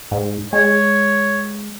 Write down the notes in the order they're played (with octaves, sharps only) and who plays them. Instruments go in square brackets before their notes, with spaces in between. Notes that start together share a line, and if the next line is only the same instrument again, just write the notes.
[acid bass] G#2
[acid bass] G#3 [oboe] C#5